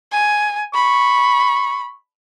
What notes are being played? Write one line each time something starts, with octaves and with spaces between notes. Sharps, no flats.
G#5
B5 C#6